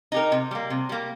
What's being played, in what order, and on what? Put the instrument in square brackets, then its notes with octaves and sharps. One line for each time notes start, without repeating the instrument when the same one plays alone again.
[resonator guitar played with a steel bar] D#4 G4 A#4
C3
G3 A#3
C3
G3 A#3